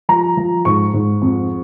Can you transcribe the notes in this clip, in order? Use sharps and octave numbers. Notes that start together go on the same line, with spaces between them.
F3 A#5
F3
G#2 C#6
G#2
F2